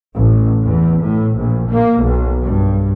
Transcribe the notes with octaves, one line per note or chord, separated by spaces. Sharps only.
A1
E2
A2
A#1
A#3
B1
G2